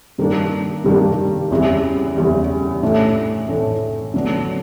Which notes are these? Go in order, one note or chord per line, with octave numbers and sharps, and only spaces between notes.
G2 D#3 G3 A#3 D4
G2 D#3 G3 A#3 D4
E2 C#3 E3 G3
E2 C#3 E3 G3
A2 E3 A3 D4
A2 E3 A3 D4
D3 F#3 B3 D4